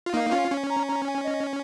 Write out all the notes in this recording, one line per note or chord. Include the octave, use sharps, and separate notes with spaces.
F4
A#3 D#4 F5
C#4 F4
C#4
A#5
A#5
G#5
D#5